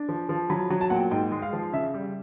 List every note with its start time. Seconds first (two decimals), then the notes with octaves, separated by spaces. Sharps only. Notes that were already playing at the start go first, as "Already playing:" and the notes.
Already playing: D4
0.09 F3
0.29 F3
0.50 F#3 B5
0.70 F#3
0.81 A5
0.90 A#2 F#5
0.96 G5
1.11 G#2 G5
1.32 G#3
1.42 F5
1.53 F3
1.73 C#3 E5
1.94 G3